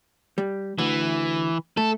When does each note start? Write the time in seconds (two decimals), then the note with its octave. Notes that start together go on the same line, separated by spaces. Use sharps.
0.38 G3
0.79 D2 E3
1.77 A3 A4